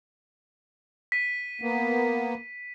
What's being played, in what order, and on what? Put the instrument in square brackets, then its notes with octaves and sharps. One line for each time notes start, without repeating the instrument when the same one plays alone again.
[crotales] B6 D#7
[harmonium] A#3 B3